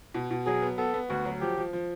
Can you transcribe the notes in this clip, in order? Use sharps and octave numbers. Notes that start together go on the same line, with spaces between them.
B2
B2
F#3 G#4
B3
B3 A4
B3
D2 F#4
F#3
F3 G4
F3
F3